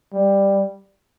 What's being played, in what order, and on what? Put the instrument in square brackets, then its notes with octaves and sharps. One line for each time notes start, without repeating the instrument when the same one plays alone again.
[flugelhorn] G3